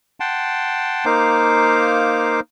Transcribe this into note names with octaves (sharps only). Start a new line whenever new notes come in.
F#5 G5 A5 C6
A#3 D#4 C5 F5 D6